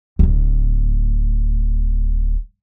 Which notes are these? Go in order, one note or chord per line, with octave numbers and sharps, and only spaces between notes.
D1 A2